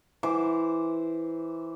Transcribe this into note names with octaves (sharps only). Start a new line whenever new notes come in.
E3 C5 D6